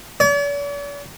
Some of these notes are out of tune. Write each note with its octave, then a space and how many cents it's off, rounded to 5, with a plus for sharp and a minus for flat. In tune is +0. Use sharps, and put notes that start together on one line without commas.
D5 -45